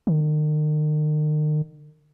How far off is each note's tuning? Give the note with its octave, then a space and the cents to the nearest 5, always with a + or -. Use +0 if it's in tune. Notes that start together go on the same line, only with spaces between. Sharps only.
D#3 -40